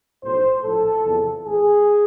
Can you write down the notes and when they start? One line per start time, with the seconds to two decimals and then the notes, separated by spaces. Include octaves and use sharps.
0.23 B1 A2 F3 C5
0.64 A#1 A2 F3 A4
1.04 E2 C3 F3
1.44 A1 A2 E3 G#4